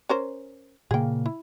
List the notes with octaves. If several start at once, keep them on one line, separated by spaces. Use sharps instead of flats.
C#4 A#4 C5
A#2 C#3 A#3 G#4 G5
E4